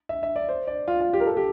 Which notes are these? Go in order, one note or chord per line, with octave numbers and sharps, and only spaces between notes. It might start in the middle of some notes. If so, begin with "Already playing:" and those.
E5
E5
D5
C5
D5
F4
F4
G4
A#4
A4
G4